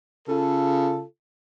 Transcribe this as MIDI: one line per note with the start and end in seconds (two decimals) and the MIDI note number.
0.28 1.01 49
0.28 1.01 65
0.28 1.01 69